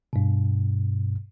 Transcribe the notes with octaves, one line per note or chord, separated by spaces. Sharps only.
G2 B2